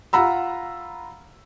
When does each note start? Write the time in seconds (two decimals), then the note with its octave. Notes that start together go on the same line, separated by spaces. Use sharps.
0.13 F4 F#5 A#5 B5 E6